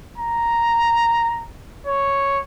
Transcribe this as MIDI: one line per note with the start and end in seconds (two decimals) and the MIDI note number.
0.18 1.47 82
1.87 2.40 73